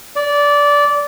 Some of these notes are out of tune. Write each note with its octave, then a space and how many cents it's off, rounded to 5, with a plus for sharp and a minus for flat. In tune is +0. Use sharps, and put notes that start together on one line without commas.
D5 -15